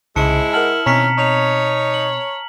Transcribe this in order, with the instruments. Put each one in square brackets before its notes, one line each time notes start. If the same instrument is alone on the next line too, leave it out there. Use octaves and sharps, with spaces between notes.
[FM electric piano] C2 C#3 [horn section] G#2 G#3 [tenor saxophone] E4 [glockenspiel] A5 C#7
[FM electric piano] A#4 F#5 A5 [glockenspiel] F6 F#7
[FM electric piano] B2 C4 [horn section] D#3 C#4 [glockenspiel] A#5 B6 C#7
[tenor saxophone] D#4 [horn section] C#5 [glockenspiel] A#5 F7
[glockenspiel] F#7